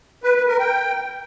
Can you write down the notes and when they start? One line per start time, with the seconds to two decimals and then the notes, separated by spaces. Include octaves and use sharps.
0.23 B4
0.35 B4
0.47 A#4
0.59 G5